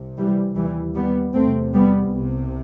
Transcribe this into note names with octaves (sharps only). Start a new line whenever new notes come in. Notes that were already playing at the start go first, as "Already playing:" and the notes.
Already playing: C2 C3
E3 G3
D#2 E3 G3
G3 B3
E2 C3 A3 C4
G3 B3
C2 C3